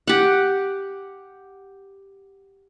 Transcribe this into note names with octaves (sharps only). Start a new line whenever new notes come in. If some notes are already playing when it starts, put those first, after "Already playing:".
G4 F#5